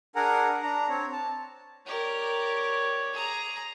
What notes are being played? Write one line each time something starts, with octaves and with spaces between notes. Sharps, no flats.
D4 G#4 A#4 F#5 G#5 A#5
D4 A#5
C4 C#5
A5
G4 A#4 C#5 D5
G#4 A#5